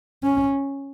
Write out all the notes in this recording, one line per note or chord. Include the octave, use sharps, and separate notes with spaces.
C#4